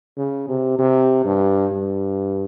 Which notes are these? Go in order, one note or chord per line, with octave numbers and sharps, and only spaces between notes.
C#3
C3
C3
G2
G2